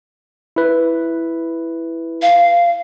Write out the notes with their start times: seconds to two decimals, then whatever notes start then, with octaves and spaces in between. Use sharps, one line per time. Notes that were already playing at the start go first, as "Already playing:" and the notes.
0.56 E4 B4
2.22 F5